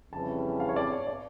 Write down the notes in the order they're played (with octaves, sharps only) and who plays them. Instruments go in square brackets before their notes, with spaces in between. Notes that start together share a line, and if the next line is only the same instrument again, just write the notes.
[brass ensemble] F2 C#3 E3 G3 [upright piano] A5
[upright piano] F5
C#5
D5
C#5
D5